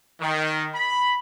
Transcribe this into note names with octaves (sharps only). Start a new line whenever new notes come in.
D#3
B5